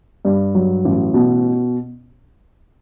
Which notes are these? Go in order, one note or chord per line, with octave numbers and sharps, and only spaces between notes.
G2
F#3
A1
B2